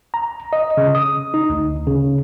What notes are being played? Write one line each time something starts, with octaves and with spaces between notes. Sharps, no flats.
A#5
D#5
C#3
D#6
D#4
D2
C#3